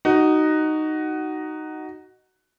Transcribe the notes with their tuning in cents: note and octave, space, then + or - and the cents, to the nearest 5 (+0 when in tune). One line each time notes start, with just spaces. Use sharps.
D#4 -5 F#4 +15